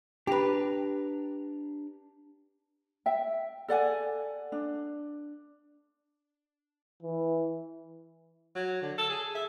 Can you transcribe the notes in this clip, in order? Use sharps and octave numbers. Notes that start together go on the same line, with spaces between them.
D4 G4 B4 A#5
E5 G5
A4 D5 F#5 G#5
D4
E3
F#3
D3
A4
G#4
E5